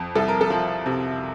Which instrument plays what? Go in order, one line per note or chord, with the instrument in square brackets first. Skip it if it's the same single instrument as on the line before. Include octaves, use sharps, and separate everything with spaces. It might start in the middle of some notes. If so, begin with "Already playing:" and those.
Already playing: [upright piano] F2
C2 A4
A#4
A4
F3
C3